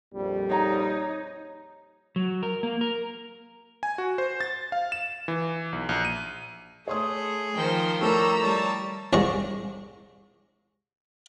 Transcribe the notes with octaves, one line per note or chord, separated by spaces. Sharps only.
A#1 F2 G3
D#4 C#5 A#5
F#3
A#4
A#3
A#4
G#5
F#4
C5
A6
F5
E7
E3
B1
A#1
D#7
A3 G#4 C#5 C6 D#6
D#3 F3 C5 G5
G3 A3 E4 A4 A#4 C#5 A#5 E6
G3 C#5 A5
C2 G2 G#3 C#6